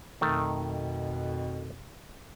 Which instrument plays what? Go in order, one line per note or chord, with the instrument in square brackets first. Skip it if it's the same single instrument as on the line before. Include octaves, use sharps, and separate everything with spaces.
[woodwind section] F2 B2 [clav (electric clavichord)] D#3 A3